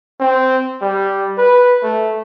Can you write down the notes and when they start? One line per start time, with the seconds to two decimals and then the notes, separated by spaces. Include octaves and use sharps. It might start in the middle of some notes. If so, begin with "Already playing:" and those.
0.20 C4
0.81 G3
1.38 B4
1.83 A3